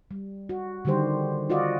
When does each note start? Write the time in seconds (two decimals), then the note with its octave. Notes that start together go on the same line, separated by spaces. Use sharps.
0.11 G3
0.49 F#4
0.85 D3 D#3 G3 G4 C5
1.50 F4 F#4 D5 D#5 F5